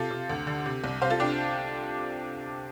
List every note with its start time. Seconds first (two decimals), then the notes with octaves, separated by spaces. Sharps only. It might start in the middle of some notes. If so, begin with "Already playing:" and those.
Already playing: C3 F4 A4
0.11 C3
0.29 D2
0.47 D3
0.66 C3
0.84 C2
1.02 C3 C5 F5
1.10 F4 A4
1.19 C3 D4 G4